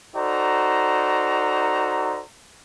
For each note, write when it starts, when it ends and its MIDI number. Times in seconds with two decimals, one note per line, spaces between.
0.15 2.22 63
0.15 2.22 66
0.15 2.22 69
0.15 2.22 72
0.15 2.22 74
0.15 2.22 82